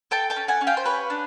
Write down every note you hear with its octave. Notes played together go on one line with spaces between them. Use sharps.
A4 G5 A5
G5 A5
C#4
F#5 G#5
C#4
F5 G5
C5
G4 B4 C#5
D4